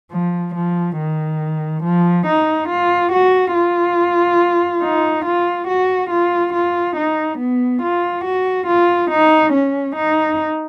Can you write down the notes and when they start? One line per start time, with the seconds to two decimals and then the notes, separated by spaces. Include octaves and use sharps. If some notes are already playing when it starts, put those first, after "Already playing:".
0.12 F3
0.54 F3
0.98 D#3
1.83 F3
2.26 D#4
2.69 F4
3.12 F#4
3.54 F4
4.82 D#4
5.25 F4
5.68 F#4
6.10 F4
6.54 F4
6.97 D#4
7.39 B3
7.82 F4
8.25 F#4
8.67 F4
9.11 D#4
9.53 C#4
9.96 D#4